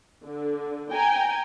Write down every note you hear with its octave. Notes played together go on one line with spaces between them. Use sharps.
D3
G5 G#5 A#5